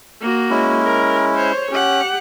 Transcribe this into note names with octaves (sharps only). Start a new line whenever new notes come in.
A#3 F#4
G#3 C#4 E4
A#4
C5 C#5
C#4 G4 F#5